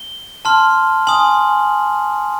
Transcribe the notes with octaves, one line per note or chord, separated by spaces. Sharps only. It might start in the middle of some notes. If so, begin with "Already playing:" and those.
Already playing: G7
A5 C6 F6
G#5 C6 D#6 F#7